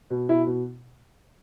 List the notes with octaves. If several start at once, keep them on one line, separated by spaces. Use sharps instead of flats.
B2
B2 E4
B2